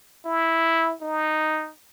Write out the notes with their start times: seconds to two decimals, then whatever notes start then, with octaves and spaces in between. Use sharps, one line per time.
0.25 E4
1.02 D#4